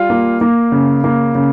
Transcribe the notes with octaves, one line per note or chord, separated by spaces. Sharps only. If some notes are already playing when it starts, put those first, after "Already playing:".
Already playing: G3 F4
A#3
A#3
C#3
A#3
C#3